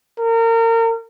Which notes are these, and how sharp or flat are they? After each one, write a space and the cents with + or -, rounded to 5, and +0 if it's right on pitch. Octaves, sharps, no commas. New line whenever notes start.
A#4 -30